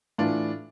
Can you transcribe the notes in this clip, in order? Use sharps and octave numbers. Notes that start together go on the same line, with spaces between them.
A2 E3 D4 F4